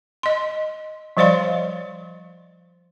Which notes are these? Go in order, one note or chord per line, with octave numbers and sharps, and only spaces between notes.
D#5 C6
F3 G3 C5 D5 F5 C6